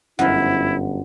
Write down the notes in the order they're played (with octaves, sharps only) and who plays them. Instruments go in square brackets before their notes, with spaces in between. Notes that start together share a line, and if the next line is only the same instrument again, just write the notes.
[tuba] G1 [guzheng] F#2 F3 [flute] E4 [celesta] F#5